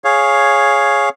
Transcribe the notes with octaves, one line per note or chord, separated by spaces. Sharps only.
G#4 C#5 F5